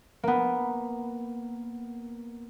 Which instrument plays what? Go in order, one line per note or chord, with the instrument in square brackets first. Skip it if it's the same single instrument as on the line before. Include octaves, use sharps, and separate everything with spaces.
[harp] A#3 B3